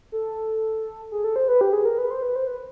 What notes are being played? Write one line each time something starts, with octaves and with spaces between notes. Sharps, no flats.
A4
G#4
A4
C5
B4
G4
G#4
A#4
B4
C5
B4
C5
B4